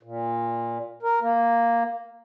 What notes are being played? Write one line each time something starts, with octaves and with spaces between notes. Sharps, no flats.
A#2
A#4
A#3